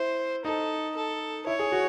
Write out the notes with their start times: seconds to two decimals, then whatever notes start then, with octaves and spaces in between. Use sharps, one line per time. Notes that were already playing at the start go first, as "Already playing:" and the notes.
Already playing: E4 C5
0.45 D#4 A4
0.96 A4
1.47 E4 C#5
1.59 G#4
1.72 F#4